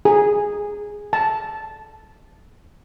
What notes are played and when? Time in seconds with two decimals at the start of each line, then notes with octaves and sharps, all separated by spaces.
0.05 G#4
1.13 A5